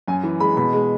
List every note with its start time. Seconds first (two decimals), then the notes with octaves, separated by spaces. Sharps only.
0.08 F#2 G#5
0.24 E3
0.40 G#3 B5
0.57 B2 B5
0.73 G#3